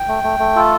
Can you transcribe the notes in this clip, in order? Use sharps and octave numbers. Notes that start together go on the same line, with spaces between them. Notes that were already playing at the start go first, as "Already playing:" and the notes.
Already playing: G5
A3
A3
A3
F4 A4